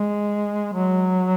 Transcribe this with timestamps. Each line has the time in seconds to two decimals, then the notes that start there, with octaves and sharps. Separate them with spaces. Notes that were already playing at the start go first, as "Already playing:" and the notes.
Already playing: G#3
0.73 F#3